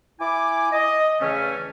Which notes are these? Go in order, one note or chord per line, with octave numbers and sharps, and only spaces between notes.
E4 G#5 D6
D#5
E2 C#3 E3 A3 C#4